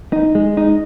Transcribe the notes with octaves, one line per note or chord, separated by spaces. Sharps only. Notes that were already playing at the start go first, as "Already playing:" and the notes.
D#4
G#3
D#4